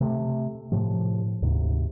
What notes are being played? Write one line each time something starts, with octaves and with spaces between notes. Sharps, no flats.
C3 A3
A2 C3 F3
D2 G#2 C3